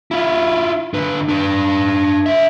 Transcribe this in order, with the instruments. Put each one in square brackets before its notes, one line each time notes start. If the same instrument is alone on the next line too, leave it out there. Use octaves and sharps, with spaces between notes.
[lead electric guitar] E4 F4
D3 B4
D4 B4
D4 E5